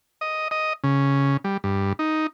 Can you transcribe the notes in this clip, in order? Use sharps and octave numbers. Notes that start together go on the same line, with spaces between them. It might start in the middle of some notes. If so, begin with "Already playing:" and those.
D#5
D#5
C#3
G3
G2
D#4